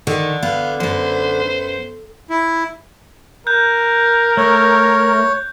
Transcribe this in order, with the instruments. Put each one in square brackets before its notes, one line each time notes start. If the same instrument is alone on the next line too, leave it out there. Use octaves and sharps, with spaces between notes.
[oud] D3 [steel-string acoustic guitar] D#3
[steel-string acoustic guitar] B3 [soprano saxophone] F5
[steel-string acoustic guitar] F#2 B3 [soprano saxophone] C5
[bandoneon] E4
[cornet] A#4 [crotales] F#6 G6
[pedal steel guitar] A3 [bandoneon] C#5